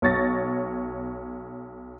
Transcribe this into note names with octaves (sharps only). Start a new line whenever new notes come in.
B1 C#5 A6 A#6